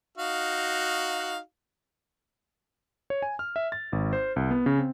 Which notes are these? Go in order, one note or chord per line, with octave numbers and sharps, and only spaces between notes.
D#4 F#4 F5
C#5
G#5
F6
E5
A6
G#1
C5
C2
B3
C#3
C4